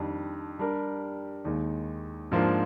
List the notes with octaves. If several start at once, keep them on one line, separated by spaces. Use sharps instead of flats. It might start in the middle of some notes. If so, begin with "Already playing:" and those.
Already playing: F2 D#3 G3 D4
G3 D4 G4 A#4
D#2 D#3 G#3
G#2 F3 A#3 D4 F4